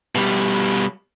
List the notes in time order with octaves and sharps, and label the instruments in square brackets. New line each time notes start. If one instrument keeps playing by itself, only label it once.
[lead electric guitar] B2 G3